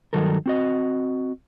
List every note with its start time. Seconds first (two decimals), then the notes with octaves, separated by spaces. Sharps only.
0.13 G2 D#3 F#3 A4 A#4
0.46 C4 F#4 D#5